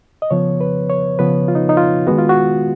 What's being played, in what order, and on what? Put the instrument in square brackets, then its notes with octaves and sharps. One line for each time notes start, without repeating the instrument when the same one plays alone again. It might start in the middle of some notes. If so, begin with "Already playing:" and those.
[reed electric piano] D#5
C#3 F3 B3 C#5
B4
C#5
C#3 F3 B3 B4
F4
D#4
D#4
F4
D#3 G#3 B3 F#4
F4
F#4